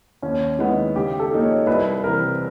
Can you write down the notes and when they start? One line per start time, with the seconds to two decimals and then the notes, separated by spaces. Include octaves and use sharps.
0.22 D#2 C#4
0.59 D#3 G#3 B3 E4
0.95 C#3 G4
1.20 A4
1.31 F3 A#3 D#4
1.43 C#5
1.67 C2 B4
2.04 C3 E3 A#4